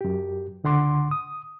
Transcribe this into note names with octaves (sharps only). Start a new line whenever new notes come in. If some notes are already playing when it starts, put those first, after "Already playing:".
F#2 G4
C#2 D3 F#5 C6 D6
D#6